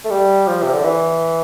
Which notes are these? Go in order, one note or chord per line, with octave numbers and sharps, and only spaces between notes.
A3
G3
F3
C3
D3
E3